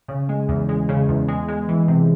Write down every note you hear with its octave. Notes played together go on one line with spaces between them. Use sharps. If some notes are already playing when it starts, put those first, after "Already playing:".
C#3
G#3
E2
G#3
C#3
E2
G#3
G#3
E3
C3